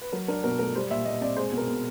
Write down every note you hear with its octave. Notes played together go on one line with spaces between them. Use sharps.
B4
F#3 A#4
D4 A#4
B2 A#4
A3 A#4
G3 C5
A#2 E5
A#2 D#5
C4 D5
G#3 C5
B2
A#4
B2